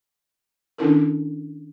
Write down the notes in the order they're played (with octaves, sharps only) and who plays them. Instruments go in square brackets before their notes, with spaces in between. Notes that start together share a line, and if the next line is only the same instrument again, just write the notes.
[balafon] D#3 C#4 D4 E4 A4 A#4